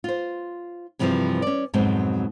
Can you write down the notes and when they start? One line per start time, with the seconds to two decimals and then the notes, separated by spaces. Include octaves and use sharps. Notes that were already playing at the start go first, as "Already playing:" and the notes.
0.04 F4 C5
0.99 G2 C3 E3 F3 G3 G#4
1.42 C#4 D5
1.74 F2 G#2 B2 F#3 G#3 C4